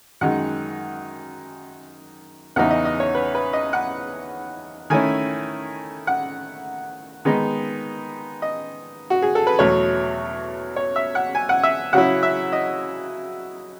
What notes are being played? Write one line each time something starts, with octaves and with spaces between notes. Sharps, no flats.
F#2 D#3 G#3 D#4 F#5
E2 C#3 E3 B3 D#4 F#5
D#5
D#5
C#5
B4
B4
D#5
F#5
D#3 A3 C#4 E4 G#5
F#5
D#3 G#3 B3 D#4
D#5
F#4
G#4
A4
B4
E2 B2 F#3 A3 C#5
C#5
E5
F#5
G#5
F#5
E5
C#3 F#3 C#4 E4 F#5
E5
D#5